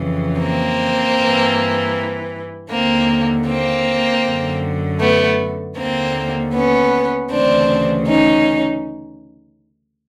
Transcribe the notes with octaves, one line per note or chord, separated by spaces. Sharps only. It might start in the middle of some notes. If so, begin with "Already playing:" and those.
Already playing: F2 C#3 E3
A#3 C4
G2 E3
D#2 D3 A#3 C4
A#3 C4
F#2 D3
A3 B3
D#2 D3 A#3 C4
B3 C#4
D2 C#3 E3 C4 D4
C#4 D#4